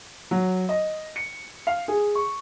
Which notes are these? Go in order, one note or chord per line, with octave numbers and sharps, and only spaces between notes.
F#3
D#5
C#7
F5
G#4
C#6